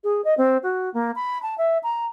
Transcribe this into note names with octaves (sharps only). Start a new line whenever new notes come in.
G#4
D#5
C4
F#4
A#3
B5
A5
E5
A#5